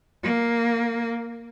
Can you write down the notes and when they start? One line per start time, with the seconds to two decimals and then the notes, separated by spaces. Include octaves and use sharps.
0.23 A#3